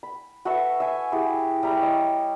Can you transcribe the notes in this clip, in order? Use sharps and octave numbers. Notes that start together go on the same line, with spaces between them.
B5
F#4 A4 B4 E5
E5 G#5
E4 G4 G#4
G3 E5 A#5
C#5 D#5